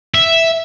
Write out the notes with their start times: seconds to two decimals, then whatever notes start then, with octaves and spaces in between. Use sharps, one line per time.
0.15 E5